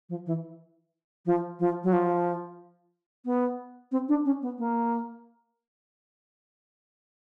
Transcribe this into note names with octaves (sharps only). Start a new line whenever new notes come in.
F3
E3
F3
F3
F#3
F3
B3
C4
D4
C#4
B3
A#3